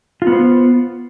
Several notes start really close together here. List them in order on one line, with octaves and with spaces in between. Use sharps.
F4 B3 C5